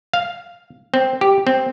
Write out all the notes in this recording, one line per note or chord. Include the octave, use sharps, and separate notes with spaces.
F5
C4
G4
C4